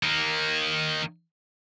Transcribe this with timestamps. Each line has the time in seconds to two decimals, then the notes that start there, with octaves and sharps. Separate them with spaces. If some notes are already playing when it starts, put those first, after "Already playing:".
0.03 D#3 A#3